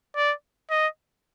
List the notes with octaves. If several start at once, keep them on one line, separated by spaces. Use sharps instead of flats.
D5
D#5